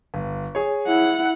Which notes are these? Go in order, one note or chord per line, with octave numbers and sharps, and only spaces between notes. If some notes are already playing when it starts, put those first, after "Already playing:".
G1
G#4 C#5
E4 F#5